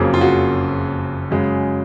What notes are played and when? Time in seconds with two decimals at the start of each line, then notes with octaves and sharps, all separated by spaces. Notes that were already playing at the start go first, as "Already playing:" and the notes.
Already playing: F#1 F2 C#3 F#3 A#3 G#4
0.14 F4
0.21 F#4
1.31 F#2 C#3 G#3